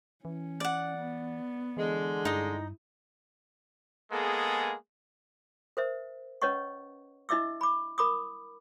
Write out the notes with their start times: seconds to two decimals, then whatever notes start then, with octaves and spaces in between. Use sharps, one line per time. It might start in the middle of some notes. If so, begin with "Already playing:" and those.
0.25 E3 C#4
0.60 D5 F#5
0.97 B3
1.77 D3 E3 G#3
2.25 G2 D#4 E4 D#5
4.11 G#3 A#3 B3 G#4 A4
5.77 A#4 C5 E5
6.42 C#4 B4 C#5 D#5 F#5 C#6
7.29 D4 E4 D#5 E5 D6 E6
7.61 B5 D6
7.98 A#4 B5 D6 D#6